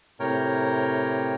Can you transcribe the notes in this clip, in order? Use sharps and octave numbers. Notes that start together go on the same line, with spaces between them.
A2 C3 A#4 C#5 G5